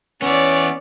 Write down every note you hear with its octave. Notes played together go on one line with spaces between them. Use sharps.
E3 B3 C#4 C#5 D5